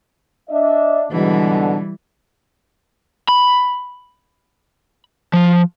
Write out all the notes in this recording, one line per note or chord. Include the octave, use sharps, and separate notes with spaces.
D4 D#5 E5
G#2 B2 D3 E3 G3
B5
F3